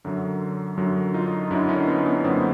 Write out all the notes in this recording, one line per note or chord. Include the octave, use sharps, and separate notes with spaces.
F#2 D3 F#3
F#2 D3 F#3
D#4 F4
F#2 D3 F#3 D4 E4
C#4 D#4
B3 C#4
B3 C#4
B3
F#2 D3 F#3 A#3 C4